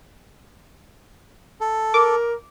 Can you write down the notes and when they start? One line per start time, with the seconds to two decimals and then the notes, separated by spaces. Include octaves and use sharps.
1.61 A4
1.94 A#4 D6